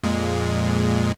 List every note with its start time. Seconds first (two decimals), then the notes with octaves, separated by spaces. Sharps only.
0.04 F2 A#2 G#3